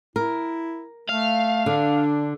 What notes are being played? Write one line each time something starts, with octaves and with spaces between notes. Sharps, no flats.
E4 A#4
A3 F5
D3 D4